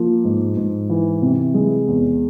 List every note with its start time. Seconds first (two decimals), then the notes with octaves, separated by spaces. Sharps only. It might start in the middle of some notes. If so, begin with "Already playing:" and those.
Already playing: F3 A#3
0.25 G#2
0.57 G#2
0.90 E3
1.22 C3
1.54 G#3
1.88 E2